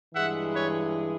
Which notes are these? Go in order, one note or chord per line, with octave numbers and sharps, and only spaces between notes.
G2 E3 G#3 E5 F#5
B4 C#5